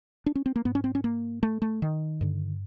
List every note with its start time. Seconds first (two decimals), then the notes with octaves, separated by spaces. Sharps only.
0.26 D4
0.35 C#4
0.46 C4
0.56 A#3
0.65 G#2 B3
0.75 C#4
0.84 C4
0.95 C#4
1.04 A#3
1.43 A3
1.62 A3
1.82 D#3
2.21 G2 D3